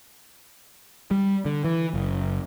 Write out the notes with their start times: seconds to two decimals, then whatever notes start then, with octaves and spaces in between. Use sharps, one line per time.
1.11 G3
1.45 D3
1.65 E3
1.94 F#1